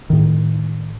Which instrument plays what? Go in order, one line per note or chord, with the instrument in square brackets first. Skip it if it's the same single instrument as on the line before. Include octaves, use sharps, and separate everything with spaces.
[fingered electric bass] A2 D#3